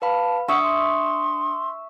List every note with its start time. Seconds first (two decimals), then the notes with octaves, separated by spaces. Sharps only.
0.02 B4 F5 A5 B5
0.48 D4 E5 F#5 C#6 D#6 C#7
0.63 C6